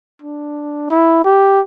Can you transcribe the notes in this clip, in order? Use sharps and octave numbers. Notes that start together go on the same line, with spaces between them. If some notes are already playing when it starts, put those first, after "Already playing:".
D4
E4
G4